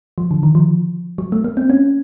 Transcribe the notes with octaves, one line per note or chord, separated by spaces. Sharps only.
F3
D3
D#3
F3
F#3
A3
A#3
C4
C#4